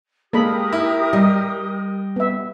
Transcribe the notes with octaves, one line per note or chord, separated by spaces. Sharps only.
G#3 A#3 G4 A4 A#4 B5 D#6
E4
G3 D#5
B3 E5